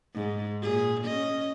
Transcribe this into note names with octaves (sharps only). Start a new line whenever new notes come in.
G#2
A#2 G#4
C#4 D#5